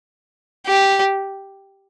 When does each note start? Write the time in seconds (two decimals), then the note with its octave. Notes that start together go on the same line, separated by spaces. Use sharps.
0.67 G4